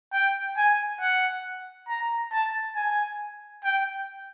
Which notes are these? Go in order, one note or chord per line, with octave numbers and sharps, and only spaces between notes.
G5
G#5
F#5
A#5
A5
G#5
G5